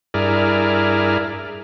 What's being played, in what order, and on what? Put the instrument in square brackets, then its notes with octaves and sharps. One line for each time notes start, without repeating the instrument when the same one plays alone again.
[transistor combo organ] G2 E4 G#4 A#4 D5 F6